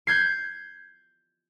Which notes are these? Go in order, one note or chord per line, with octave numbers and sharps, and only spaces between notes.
G6 G#6 C7